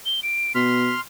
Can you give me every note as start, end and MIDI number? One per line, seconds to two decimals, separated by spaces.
0.06 0.20 103
0.23 0.55 98
0.55 0.94 47
0.55 1.00 84
0.55 1.00 89
0.55 0.94 95